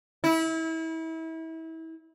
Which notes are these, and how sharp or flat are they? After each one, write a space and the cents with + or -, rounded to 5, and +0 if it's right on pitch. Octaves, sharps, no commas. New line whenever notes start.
E4 -30